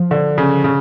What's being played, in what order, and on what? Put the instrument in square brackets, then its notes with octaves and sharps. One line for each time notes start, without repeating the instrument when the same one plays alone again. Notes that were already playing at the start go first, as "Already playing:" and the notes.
Already playing: [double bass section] F3
[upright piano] D3
C#3
C#3